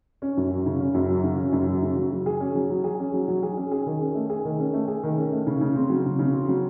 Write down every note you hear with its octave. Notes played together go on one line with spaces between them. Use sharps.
C#4
F#2
F#3
C#3
C#4
F#2
F#3
C#3
C#4
F#2
F#3
C#3
F#3
F#3
G#4
C#4
F#3
F#3
G#4
C#4
F#3
F#3
G#4
C#4
G#4
D#3
C#4
A3
G#4
D#3
C#4
A3
G#4
D#3
C#4
A3
C#3
C#3
C4
F#3
C#3
C#3
C4
F#3